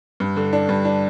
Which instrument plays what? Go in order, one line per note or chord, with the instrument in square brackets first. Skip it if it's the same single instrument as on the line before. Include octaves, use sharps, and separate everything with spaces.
[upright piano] G2
D3
D4
G2
D4